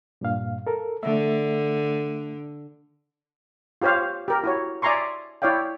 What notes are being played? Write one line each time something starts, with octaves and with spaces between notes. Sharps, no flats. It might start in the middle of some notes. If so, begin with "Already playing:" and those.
G2 A#2 F5
A4 A#4
D3 A3 E5
F4 G4 C5 C#5 F5
G4 A#4
E4 F#4 C#5
D5 E5 G#5 A#5 C6 C#6
E4 C#5 D5 F5 G5